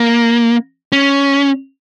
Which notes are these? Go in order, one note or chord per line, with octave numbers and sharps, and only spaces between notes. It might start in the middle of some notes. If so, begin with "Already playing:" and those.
Already playing: A#3
C#4